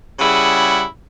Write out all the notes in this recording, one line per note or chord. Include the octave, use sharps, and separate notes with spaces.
C#3 G3 E4 G#4 F#5